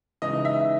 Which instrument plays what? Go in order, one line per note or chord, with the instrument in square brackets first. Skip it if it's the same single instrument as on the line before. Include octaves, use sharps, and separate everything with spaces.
[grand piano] C#3 E3 G#3 D#4 [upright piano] D#5
[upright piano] E5